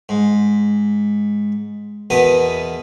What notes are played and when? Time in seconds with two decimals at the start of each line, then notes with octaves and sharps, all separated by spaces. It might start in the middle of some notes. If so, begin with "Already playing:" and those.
0.09 G#2
2.10 E2 B2 B3 A#4 D#6